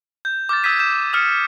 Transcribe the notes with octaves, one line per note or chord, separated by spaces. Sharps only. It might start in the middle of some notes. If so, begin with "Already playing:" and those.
G6
D6 F6 G6 A6
D#6 E6 G6 G#6 B6 D#7
G6 E7
D#6 F6 C#7